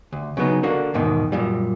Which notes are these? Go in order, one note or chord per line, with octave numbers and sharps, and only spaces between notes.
D2
C#3 F#3 B3 D#4
D3 A#3 F#4
E2 G#2 B2 D#3
F#2 A#2 G3